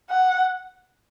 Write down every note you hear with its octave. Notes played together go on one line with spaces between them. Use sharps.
F#5